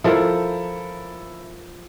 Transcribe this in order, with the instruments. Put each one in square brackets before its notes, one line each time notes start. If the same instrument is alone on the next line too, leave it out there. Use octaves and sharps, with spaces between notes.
[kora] F3 A#4 [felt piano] E4 A4